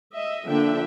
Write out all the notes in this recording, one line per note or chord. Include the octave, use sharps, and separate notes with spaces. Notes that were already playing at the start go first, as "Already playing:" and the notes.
D#5 E5
D3 F3 A#3 D4 E5 G5